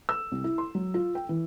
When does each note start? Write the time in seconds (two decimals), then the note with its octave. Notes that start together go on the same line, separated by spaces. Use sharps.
0.09 E6
0.32 C2
0.44 E4
0.58 C6
0.75 F#3
0.94 F4
1.15 G5
1.29 E3